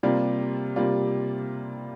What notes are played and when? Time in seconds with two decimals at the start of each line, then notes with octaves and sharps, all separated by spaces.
0.03 C3 G3 A#3 F4 D5
0.76 C3 G3 A#3 F4 D5